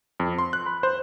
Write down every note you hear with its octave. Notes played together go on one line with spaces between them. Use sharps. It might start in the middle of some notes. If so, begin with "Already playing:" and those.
F2
C6
F#6
B5
C5